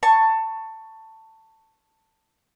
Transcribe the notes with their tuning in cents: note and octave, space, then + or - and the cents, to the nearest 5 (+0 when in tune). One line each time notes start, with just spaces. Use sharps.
A5 +15 C#6 +0